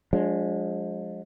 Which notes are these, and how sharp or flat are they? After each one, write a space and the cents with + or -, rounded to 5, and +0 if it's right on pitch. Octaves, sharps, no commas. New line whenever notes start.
F3 +35 G#3 +0 D4 -15